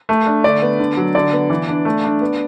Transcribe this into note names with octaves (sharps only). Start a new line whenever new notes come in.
A3
D4
D3 D5
B3
D3
F#3
D3 D5
B3
E3
D4
A3
D4
B3